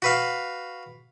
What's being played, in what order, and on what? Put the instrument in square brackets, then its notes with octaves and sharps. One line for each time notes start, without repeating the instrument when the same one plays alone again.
[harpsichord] F#4 B4 F5